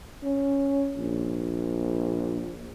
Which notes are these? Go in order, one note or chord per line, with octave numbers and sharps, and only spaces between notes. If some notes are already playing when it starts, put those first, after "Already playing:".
C#4
A#1